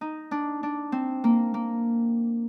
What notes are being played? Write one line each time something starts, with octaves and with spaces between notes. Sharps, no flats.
D#4
D4
D4
C4
A#3
A#3